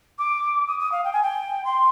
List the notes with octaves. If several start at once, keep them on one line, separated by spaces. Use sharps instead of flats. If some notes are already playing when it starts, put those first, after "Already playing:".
D6
D#6
D#6
F5
G5
G#5
G5
C6